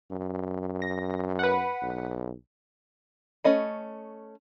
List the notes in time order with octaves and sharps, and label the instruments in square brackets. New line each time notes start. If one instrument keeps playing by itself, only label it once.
[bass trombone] F#2
[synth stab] A#6
B4 F#5
[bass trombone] B1
[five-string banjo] A3 C#4 D#5 B5